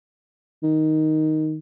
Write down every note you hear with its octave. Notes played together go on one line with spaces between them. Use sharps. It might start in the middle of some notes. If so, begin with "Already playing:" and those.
D#3